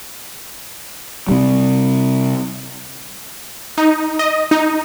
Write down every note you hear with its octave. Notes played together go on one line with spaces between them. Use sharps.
C3 G3
D#4
D#5
D#4